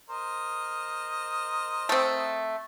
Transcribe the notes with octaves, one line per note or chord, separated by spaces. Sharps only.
A#4 C5 D#5
A3 C4